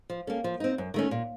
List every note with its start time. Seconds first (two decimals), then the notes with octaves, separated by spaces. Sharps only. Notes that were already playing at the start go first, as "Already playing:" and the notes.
0.10 F3
0.27 A#3 C#4 A4
0.44 F3
0.60 C4 D#4
0.78 F#2
0.94 D#3 A3 C#4
1.11 A#2